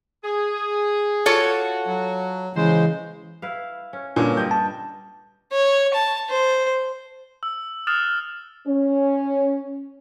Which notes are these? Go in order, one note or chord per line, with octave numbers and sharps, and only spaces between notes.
G#4
F4 F#4 A4 C#5
F#3
C#3 E3 G#3 C5
E4 B4 F5
C#4
G2 A#2 D3 C#4 F#4
G3 G4 D#5 G6
A5
C#5
A5
C5
E6
D#6 F6 F#6 A6 E7
C#4